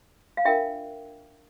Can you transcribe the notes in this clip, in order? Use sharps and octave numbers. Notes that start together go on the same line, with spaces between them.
F5
D4 F4 A#4 E5 G5